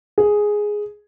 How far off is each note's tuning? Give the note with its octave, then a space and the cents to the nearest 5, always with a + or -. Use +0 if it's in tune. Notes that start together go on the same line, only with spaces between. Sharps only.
G#4 +0